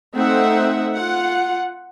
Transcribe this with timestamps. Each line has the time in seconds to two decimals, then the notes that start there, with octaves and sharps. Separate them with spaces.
0.15 A3 C4 D#4 E5 F#5
0.94 F4 F#5